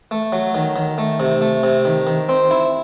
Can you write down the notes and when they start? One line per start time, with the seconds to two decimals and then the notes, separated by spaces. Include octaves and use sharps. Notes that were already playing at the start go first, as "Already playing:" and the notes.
0.11 A3
0.33 F#3
0.55 D#3
0.76 D#3
0.98 A3
1.20 C3
1.41 A3
1.63 C3
1.85 D#3
2.07 D#3
2.29 C4
2.51 E4